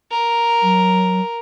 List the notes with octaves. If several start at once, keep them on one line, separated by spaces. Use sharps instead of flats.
A#4
F#3